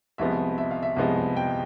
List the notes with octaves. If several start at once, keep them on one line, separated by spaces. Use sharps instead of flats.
C2 C3 F3 G#3 B3 E5
E5
F5
E5
C2 C3 F3 G#3 B3
G5